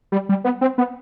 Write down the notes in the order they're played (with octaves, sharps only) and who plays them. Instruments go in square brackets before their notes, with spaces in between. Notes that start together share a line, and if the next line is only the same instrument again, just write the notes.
[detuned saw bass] G3
G3
B3
C4
B3